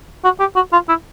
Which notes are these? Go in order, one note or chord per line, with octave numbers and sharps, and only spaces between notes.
F#4
G4
F#4
F4
E4